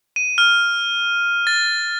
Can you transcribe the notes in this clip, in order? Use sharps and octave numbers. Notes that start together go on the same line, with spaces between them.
D#7
F6
A6